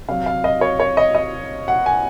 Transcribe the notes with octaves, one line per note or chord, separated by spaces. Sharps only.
C3 F#3 F5
F5
D#5
C#5
C#5
D#5
D#5
F#5
G#5